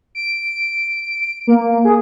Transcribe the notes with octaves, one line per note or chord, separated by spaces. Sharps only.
D7
A#3
G#4